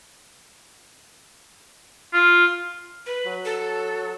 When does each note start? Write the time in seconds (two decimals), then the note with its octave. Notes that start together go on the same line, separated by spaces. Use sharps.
2.13 F4
3.06 B4
3.26 F#3
3.45 A4